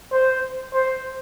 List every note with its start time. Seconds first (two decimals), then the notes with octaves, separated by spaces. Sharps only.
0.12 C5
0.74 C5